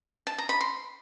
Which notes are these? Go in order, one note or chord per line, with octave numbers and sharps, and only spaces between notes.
A5
A#5
B5
C6